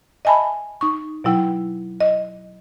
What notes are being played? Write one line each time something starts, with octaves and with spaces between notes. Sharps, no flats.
D#5 E5 G#5 A5 B5
D#4 C#6
B2 F#3 E4 G5
D#5